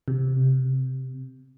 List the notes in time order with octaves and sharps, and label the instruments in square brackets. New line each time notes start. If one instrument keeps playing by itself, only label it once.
[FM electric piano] C3